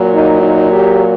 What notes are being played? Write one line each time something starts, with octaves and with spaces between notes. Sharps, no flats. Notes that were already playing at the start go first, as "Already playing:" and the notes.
Already playing: A#2 F#3 A#3
D#4
D#4
G4